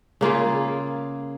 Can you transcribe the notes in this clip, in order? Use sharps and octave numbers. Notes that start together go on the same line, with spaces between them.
C#3 A#3 F4 G#4